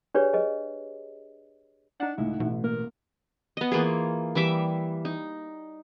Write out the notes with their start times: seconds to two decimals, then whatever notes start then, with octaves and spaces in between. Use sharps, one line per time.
0.14 D4 G4 G#4 B4 C#5 D5
0.33 G#4 B4 D#5
2.00 D4 D#4 F#5
2.18 C#2 A2 E4
2.40 A1 B2 A3
2.64 A#3 A#4
3.57 B3 D#5
3.72 E3 A#3 F4 G#4
4.35 E3 G3 E5 D6
5.05 D#4